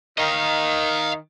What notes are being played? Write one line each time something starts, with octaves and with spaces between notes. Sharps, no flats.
D#3 D#5 F5